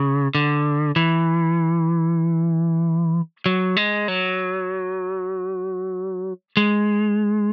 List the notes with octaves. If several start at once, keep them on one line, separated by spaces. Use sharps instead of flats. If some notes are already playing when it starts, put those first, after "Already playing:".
Already playing: C#3
D3
E3
F#3
G#3
F#3
G#3